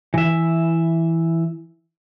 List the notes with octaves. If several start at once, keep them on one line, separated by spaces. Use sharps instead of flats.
E3 E5